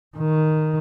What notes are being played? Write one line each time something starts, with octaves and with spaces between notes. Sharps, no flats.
D#3